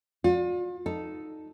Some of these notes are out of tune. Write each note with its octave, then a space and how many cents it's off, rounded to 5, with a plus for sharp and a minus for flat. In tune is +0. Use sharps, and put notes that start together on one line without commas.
F4 +40 D5 +0
D#4 +0 A4 +0